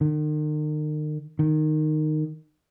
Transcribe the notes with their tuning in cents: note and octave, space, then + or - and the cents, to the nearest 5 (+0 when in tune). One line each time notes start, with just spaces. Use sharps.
D#3 -40
D#3 -15